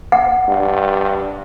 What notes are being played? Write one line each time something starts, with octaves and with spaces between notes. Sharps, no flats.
F#5
G2